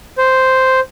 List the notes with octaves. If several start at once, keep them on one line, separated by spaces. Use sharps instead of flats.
C5